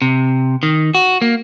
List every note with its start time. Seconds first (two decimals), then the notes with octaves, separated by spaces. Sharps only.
0.02 C3
0.63 D#3
0.95 F#4
1.22 A#3